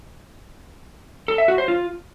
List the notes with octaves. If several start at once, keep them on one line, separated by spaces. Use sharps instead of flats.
A4
E5
F#4
C5
F4